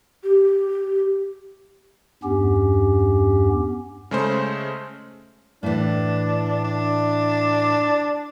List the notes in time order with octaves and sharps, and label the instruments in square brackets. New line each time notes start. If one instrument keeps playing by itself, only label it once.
[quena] G4
[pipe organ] E2 G2 B3 C#4 G4
[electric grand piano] C#3 G#3 A3 C#4 C5
[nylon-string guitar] A2 E3 [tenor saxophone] D4
[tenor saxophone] D4